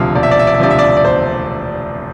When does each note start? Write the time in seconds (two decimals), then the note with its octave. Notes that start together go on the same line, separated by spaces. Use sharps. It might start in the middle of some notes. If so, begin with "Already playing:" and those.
Already playing: E1 D2 C3 F3 F5
0.15 E1 D5
0.23 E5
0.31 D5
0.39 E5
0.47 D5
0.55 E5
0.60 D2 C3 F3 D5
0.71 E5
0.79 D5
0.97 D5
1.05 E1 C5